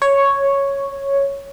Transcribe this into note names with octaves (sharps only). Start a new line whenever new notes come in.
C#5